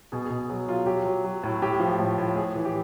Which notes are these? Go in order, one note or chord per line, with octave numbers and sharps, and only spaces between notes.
B2 G#4
G#4
B2
F#3 G#4
F#3 F4
F#3 G4
F#3
F#3
A2
A2 G4
F3
A2
A2
A2 G#4
E3 G#4
G4